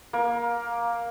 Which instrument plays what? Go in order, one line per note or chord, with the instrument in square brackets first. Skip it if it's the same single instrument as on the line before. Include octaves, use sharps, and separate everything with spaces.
[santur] A#3